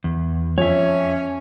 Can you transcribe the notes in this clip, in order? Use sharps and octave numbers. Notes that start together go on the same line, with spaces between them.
E2
F2 C#4 C#5 E5